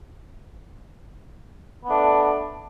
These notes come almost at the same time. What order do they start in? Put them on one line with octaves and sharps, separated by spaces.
B3 A3 D4